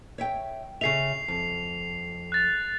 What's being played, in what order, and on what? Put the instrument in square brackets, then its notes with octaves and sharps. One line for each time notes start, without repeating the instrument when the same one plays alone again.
[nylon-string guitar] C#5 E5 G5
[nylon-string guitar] C#3 G#4 E5 [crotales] C7 F7
[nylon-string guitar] F2
[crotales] F#6 A6 F7